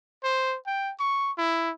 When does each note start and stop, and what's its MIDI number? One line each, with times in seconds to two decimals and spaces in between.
0.24 0.56 72
0.67 0.92 79
1.00 1.32 85
1.38 1.71 64